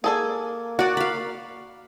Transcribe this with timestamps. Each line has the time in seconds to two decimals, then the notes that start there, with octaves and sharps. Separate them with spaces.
0.04 A#3 G#4 A4 G#5
0.79 F#4 D5 F#5
0.97 F5 B5